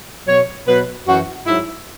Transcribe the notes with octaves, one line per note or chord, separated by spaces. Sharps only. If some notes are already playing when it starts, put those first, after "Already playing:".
B2 F#3 C#5
B2 F#3 B4
F#2 E3 F#4
G#2 F#3 E4